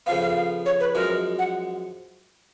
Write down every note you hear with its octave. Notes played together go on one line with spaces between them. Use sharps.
F2 C#3 F3 B3 F5
F5
F5
C#5
B4
F#2 F3 G#3 A#4
F#5